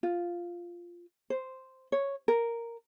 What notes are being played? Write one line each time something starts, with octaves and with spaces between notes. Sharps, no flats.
F4
C5
C#5
A#4